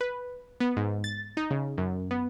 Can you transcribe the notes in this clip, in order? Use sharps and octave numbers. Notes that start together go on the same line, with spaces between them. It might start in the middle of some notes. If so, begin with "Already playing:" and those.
B4
B3
G#2
A6
D#4
C#3
F#2
B3